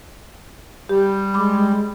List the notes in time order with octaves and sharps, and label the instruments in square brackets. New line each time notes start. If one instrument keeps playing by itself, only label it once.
[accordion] G3 [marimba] G4
[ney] G#3 [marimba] B5 D6